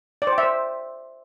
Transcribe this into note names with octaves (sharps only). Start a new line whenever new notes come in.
D5
C5
G5
E5
C5